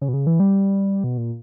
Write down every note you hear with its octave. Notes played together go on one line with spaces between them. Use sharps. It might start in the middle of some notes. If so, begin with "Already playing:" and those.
C#3
B2
C#3
E3
G3
B2
A#2